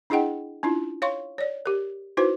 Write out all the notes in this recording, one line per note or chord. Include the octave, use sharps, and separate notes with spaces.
D4 E4 G#4 D#5 F#5 G5
C#4 D4 E4 F4
C#5 F5 C6 C#6
C#5 D5
G4 A#4
D#4 E4 F#4 B4 C5